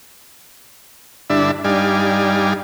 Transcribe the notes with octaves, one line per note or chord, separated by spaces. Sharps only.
G2 D3 D4 E4 E5
G2 G3 D#4 D5 F5 G#5